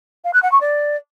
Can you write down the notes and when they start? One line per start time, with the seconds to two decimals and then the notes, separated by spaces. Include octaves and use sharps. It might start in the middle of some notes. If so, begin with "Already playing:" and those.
0.24 F5
0.33 F#6
0.42 F#5
0.52 C#6
0.61 D5